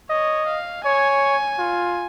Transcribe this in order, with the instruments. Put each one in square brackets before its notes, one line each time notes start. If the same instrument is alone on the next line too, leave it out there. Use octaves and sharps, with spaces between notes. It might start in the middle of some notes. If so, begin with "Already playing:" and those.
[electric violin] C#5 [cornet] D#5
[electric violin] F5
[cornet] C#5 [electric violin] G#5
[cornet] F4